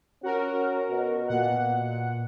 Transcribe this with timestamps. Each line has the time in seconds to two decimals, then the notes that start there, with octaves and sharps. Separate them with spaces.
0.23 C#4 F#4 A#4
0.90 B2
1.28 A#2 F#5